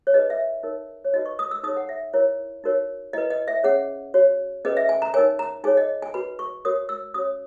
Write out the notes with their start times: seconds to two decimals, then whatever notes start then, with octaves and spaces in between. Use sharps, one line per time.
0.07 C#5
0.13 D#4 G#4 B4 D#5
0.30 E5
0.63 D#4 A#4 C#5
1.04 C#5
1.13 D#4 F#4 B4 D#5
1.26 C#6
1.39 D#6
1.51 E6
1.64 D#4 G#4 C#5 D#6
1.77 F#5
1.89 E5
2.13 E4 A#4 C#5
2.64 D#4 F#4 A#4 C#5
3.13 E4 B4 D#5
3.30 D#5
3.48 E5
3.63 C#4 G#4 C#5 F#5
4.14 F#4 C#5
4.65 C#4 G#4 B4 D#5
4.77 E5
4.89 G#5
5.02 A#5
5.14 D#4 A#4 C#5 G#5
5.39 A#5
5.64 D#4 G#4 C#5 G#5
5.77 D#5
6.02 G#5
6.14 F#4 B4 B5
6.39 C#6
6.65 F#4 A#4 C#5 D#6
6.89 E6
7.14 C#4 F#4 C#5 D#6